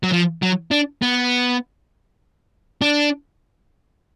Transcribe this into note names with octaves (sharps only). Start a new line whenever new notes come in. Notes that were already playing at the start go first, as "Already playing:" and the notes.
F#3
F3
F#3
D4
B3
D4